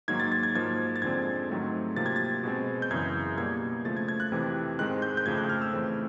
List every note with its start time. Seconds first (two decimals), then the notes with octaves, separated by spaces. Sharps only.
0.08 G#2 D#3 F#3 A#3 G#6
0.20 A6
0.32 A6
0.43 G#6
0.55 G#2 F3 A#3 G#6
0.96 A6
1.02 F2 D3 F3 G#3 C4 G#6
1.50 G#2 D#3 F#3 A3 C4
1.97 C3 F3 A#3 A6
2.06 G#6
2.16 A6
2.43 B2 G#3 C4
2.82 G6
2.91 F#2 C#3 E3 G#3 G#6
3.38 B2 G3 A#3 G#6
3.85 C#3 F3 A3 A6
3.97 G#6
4.08 G#6
4.20 F#6
4.32 F2 C3 E3
4.79 G#2 D#3 G#3 C4 F#6
5.02 G6
5.17 G6
5.26 F2 C#3 F3 A3 G#6
5.38 F#6
5.50 F6
5.62 E6
5.73 F2 C#3 E3 A3 C4